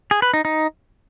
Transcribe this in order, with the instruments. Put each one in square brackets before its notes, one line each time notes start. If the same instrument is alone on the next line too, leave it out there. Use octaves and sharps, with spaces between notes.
[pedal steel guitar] G#4
B4
D#4
D#4